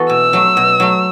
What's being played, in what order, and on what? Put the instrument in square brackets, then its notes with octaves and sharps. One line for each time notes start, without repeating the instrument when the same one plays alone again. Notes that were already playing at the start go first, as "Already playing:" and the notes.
Already playing: [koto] E3 B3 F#4 A4
[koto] B2 [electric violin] E6
[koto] F#3 A3
B2
F#3 A3